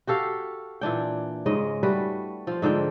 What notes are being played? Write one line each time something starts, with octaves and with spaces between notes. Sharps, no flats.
F#4 G4 A4 F5
A#2 E3 D4 G5
G#2 C#3 G#3 D#5
G3 A3 F#4 B4
F3 F4
G#2 D3 F3 G5